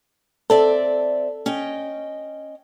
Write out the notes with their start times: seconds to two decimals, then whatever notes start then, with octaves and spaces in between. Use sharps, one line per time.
0.50 C4 A4 D5 E5
1.46 C#4 D#5 G5